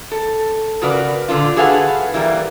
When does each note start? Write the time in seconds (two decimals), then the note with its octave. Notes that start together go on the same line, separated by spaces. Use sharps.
0.12 A4
0.82 C#3 F#4 A#4 B4 D5
1.28 A#2 D3 A#3 D4 F4
1.56 F#4 G#4 A4 B4 F5 F#5
2.14 E3 G3 A#3